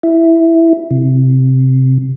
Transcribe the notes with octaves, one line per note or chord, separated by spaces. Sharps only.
E4
C3